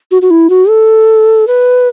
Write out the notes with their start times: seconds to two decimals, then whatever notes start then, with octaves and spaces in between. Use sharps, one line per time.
0.11 F#4
0.22 F#4
0.30 E4
0.50 F#4
0.69 A4
1.47 B4